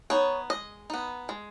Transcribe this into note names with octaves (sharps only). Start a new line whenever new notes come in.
B3 D#4 C#5
G#3 D#5
B3 D#4
G#3